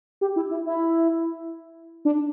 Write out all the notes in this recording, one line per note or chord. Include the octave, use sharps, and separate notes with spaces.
G4
E4
E4
E4
D4